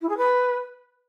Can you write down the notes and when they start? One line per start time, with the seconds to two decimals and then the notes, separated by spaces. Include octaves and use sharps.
0.01 E4
0.09 G#4
0.17 B4